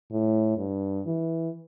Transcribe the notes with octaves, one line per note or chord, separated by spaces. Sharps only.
A2
G2
E3